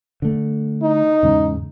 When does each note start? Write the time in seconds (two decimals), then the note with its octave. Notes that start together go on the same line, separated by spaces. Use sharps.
0.22 D3 A3
0.83 D#4
1.23 E2 G#2 C#3